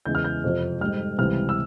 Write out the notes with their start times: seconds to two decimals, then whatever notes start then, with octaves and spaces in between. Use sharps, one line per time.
0.05 E2 C#3 E3 G#3 G6
0.15 F6
0.24 G6
0.44 F2 C3 F3
0.81 G#2 G3 F6
1.18 C#2 C3 E3 G3 F6
1.49 E6